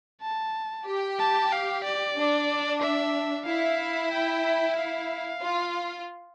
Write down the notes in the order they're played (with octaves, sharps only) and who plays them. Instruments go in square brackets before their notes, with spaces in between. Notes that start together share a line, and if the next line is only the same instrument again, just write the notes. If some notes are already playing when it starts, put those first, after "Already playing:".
[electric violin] A5
[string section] G4
[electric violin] A5
F5
D5
[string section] D4
[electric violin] E5
[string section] E4 [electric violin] F5
[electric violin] G5
F5
[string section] F4